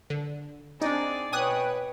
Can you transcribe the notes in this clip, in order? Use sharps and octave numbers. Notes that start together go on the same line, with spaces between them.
D3
C4 D4 D#4 G#4 D5
B2 B4 C#5 G5 G#5 D#6 F#6